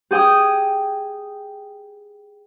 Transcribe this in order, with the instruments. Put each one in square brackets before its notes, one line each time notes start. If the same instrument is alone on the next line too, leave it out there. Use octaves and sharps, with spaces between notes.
[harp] G4 G#4 G5 G#5 D#6